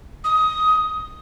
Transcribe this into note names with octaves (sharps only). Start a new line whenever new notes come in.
D#6